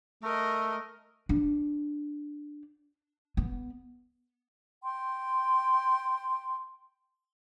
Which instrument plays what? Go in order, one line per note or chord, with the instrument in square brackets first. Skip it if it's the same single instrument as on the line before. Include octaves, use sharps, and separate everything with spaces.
[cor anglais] A3 [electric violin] A#4 D#5
[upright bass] D4
B3
[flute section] G5 C6